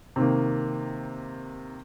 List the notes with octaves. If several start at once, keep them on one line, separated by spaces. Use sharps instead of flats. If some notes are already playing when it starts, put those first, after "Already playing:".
C3 D#3 A#3